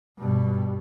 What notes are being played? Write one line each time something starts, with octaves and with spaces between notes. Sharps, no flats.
G2 B2